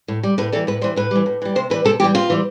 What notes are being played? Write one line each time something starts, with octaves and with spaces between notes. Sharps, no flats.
A2
G3
A2 B4
E3 G3 A4
A2 B4
E3 G3 C5
A2 B4
E3 G3
A2
E3 G3
C3 C5
E3 G3 B4
C3 A4
E3 G3 G4
C3 F4
E3 G3